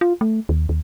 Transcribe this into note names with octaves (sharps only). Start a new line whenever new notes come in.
F4
A3
D#2
D#2